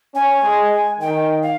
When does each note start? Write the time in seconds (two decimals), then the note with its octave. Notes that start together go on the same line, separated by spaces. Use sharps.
0.15 C#4 G#5
0.43 G#3
1.00 D#3 G5
1.42 F5